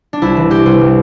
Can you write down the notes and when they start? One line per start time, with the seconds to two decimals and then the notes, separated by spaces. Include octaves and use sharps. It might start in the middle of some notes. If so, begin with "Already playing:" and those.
0.13 D4
0.22 C2 E4
0.37 E3
0.50 C3 G4
0.66 C2
0.81 E3